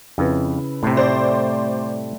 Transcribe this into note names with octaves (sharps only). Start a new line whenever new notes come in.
F2 C#3 E4 B4
A2 C3 G3 A3 C6
G4 C5 D5